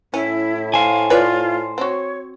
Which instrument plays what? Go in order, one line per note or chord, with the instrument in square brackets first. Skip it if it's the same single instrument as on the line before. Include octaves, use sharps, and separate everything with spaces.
[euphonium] A2 [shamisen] C#4 [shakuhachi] E4
[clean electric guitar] C5 G#5 [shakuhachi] F5
[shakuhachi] F4 [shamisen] B4 C#5 D5
[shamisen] C4 F#4 [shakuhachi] C#5